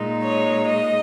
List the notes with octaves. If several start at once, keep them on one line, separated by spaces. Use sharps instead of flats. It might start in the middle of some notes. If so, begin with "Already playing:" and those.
Already playing: A#2 G#3 D#4
C#5
D#5